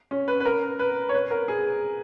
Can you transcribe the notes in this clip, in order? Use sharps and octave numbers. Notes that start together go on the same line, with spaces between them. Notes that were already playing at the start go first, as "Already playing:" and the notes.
C#4
B4
B4
A#4
B4
C#5
B4
A#4
G#4